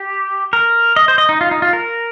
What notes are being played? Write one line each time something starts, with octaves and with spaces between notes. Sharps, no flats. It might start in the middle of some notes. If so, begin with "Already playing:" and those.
Already playing: G4
A#4
D#5
C5
D#5
D#4
F4
D#4
F4
A#4